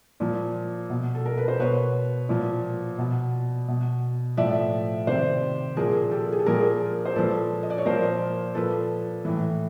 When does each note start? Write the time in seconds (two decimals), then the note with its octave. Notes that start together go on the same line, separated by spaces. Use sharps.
0.20 A#2 F3
0.90 B2
1.15 A4
1.26 A#4
1.38 B4
1.48 C5
1.59 B2 B4 C#5
2.29 A#2 F3
2.98 B2
3.68 B2
4.37 A2 F3 D5 E5
5.07 C3 D#3 C5 D5
5.77 A#2 F3 G#4 A#4
6.11 G4 A4
6.32 G#4
6.39 A4
6.46 A#2 F3 G#4 A#4
7.05 C5
7.16 A#2 F3 A4 B4
7.63 D#5
7.70 D5
7.78 C#5
7.85 A#2 F3 A#4 C5
8.55 A#2 F3 A4 B4
9.25 A2 E3